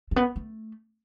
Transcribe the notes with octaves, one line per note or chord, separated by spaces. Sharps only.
A3
B3
A3